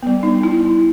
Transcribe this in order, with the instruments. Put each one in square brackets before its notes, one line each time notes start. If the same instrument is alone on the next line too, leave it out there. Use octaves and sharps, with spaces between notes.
[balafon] G3 B3
D#4
E4